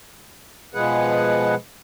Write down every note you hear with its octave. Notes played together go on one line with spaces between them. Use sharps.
B2 F3 G#3 G#4 B4 F#5